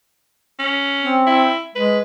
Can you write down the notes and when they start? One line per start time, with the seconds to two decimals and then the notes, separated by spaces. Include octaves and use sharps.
0.59 C#4
1.01 C4
1.27 E4
1.75 G#3 B4